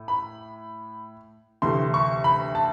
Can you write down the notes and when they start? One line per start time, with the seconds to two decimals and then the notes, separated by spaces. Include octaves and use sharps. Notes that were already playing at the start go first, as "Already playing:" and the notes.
Already playing: A2
0.08 B5
1.62 D2 C3 E3 A3 C6
1.94 C#6
2.24 B5
2.55 A5